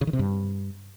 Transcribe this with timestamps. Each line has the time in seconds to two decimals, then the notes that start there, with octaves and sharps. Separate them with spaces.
0.01 C#3
0.07 D#3
0.13 C3
0.19 G2